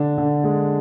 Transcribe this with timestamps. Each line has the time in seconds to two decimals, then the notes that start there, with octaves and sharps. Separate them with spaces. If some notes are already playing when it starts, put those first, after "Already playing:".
Already playing: D3 D4
0.18 D3
0.44 G#3